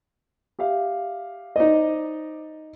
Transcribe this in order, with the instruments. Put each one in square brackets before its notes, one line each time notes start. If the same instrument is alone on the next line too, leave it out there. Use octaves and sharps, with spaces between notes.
[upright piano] G4 E5 F5
[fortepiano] D#4 D#5 [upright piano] C5 D5